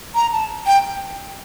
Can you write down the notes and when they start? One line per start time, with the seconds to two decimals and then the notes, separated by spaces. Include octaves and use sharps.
0.15 A#5
0.33 A5
0.66 G5